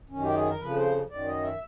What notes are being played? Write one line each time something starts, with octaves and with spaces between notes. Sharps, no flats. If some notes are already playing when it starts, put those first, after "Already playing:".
F#2 D#3 C#4
G4
G#4
A#4
F2 C#3 F3 B4
C5
F#2 D#3 D5
D#5
E5